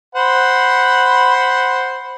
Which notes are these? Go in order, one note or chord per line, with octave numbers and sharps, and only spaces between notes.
C5 F#5 B5